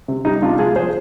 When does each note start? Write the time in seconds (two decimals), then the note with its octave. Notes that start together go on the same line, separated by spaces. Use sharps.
0.08 C3
0.25 G3 D#4
0.42 C2 D4 F4
0.59 G#3 F4 G#4
0.76 F3 G#4 C5